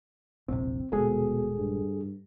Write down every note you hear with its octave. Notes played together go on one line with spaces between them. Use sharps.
E1 A#1 C3 C4
D#1 D2 B2 G#3 G#4 A4
G2